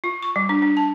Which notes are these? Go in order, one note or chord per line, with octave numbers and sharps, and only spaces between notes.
F4
C#6
G3
D4
D4
A5